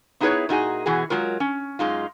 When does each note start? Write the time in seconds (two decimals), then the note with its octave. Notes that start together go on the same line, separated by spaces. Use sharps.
0.20 B3 D#4 E4 G#4 B4 C#5
0.49 A#2 D#4 F#4 G#4
0.86 B2 E3 F#4 G#4
1.10 F#3 G#3 F4 A#4
1.40 C#4
1.79 F#2 G#3 D#4 F4